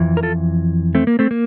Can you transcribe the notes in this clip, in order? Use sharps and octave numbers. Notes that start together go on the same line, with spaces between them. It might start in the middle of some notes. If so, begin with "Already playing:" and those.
Already playing: F2 E3
A#4
F4 A4
A3 C4
A#3
A3 C4
A#3